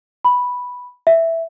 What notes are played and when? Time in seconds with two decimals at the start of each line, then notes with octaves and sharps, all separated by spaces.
0.25 B5
1.07 E5